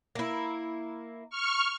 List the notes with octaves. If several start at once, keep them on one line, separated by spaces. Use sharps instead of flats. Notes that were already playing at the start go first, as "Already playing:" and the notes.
A#3 E4
C#6 F6